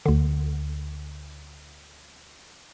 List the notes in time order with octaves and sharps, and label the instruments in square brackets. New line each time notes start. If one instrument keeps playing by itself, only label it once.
[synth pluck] D2 D3